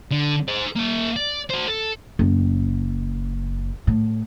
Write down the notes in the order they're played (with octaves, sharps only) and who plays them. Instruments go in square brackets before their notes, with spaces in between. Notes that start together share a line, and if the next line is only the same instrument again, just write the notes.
[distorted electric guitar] D3
G#4 C5
A#3 E5
D5
F#4 C5
A4
[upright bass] F#1
A2